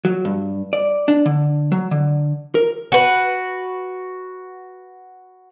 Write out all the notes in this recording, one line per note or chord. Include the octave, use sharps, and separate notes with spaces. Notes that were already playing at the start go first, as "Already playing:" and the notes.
F#3
G2
D5
D4
D3
F#3
D3
A#4
F#4 B4